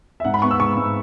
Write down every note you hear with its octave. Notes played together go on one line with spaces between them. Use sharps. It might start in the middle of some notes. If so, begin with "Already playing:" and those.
E5
G#2 F#5
B5
B3 C#6
E6
G#2 C#6
G#2